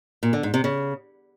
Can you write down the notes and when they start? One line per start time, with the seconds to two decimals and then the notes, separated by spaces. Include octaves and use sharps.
0.23 A#2
0.33 D3
0.43 G#2
0.54 C3
0.64 C#3